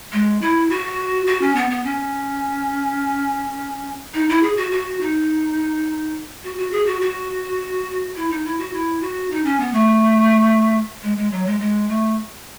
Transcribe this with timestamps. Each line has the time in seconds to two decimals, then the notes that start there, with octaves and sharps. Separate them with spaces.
0.12 G#3
0.42 E4
0.70 F#4
1.27 F#4
1.41 C#4
1.56 B3
1.70 B3
1.85 C#4
4.14 D#4
4.29 E4
4.43 G#4
4.57 F#4
4.72 F#4
5.01 D#4
6.44 F#4
6.58 F#4
6.72 G#4
6.86 F#4
7.01 F#4
8.16 E4
8.31 D#4
8.45 E4
8.59 F#4
8.73 E4
9.01 F#4
9.30 D#4
9.45 C#4
9.60 B3
9.73 A3
11.03 G#3
11.17 G#3
11.31 F#3
11.46 G#3
11.60 G#3
11.89 A3